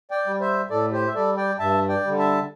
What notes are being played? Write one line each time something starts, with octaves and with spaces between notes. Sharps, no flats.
D5 G5
G3
C5 E5
A2 A4 D5
G4 C5
E5
G3 A4 D5
D5 G5
G2 E5 A5
D5 G5
D3 G3
E5 A5